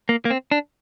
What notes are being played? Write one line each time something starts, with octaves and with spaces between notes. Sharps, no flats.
A#3
A#3
C4
D4